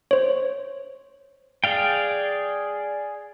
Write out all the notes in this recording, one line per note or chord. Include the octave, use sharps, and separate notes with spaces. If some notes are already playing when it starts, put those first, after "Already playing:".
C5 C#5
G#4 D5 F5 G5